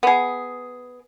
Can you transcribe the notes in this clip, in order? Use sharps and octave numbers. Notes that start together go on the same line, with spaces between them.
B3 G#4